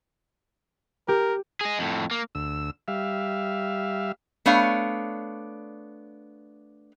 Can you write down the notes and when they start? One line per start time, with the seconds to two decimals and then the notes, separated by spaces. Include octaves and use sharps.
1.08 G4 A#4
1.61 G#4 D#5
1.79 F2 A2
2.11 A#3
2.35 D2 E6
2.88 G3 E5 F5
4.46 A3 B3 D4 C#5 F5